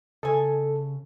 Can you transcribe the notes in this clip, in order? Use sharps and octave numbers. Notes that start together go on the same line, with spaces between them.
C#3 A4 D#5 G#5